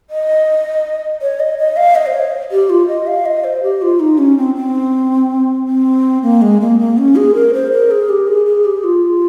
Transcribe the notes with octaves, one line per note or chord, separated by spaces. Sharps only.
D#5
C#5
D#5
D#5
F5
D#5
C5
C#5
G4
F4
D#5
F5
D#5
C5
G4
F4
D#4
C#4
C4
C4
C4
A#3
G#3
A#3
A#3
C#4
G#4
A#4
C5
A#4
G#4
G4
G#4
G#4
G4
F4